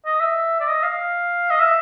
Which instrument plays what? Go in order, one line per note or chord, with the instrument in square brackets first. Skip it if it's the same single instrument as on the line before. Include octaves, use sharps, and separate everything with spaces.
[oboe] D#5
E5
D5
D#5
F5
D#5
E5